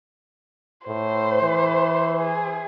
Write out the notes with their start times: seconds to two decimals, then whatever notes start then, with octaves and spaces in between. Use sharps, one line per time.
0.87 A2 C5
1.42 E3
2.19 G#4